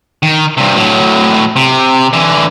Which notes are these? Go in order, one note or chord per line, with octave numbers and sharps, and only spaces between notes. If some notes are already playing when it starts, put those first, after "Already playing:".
D#3
G2 C3
A2 F#3
C3
D3 E3